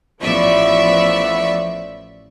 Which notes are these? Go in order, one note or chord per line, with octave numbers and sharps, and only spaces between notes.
A1 F3 B3 D5 E5 C#6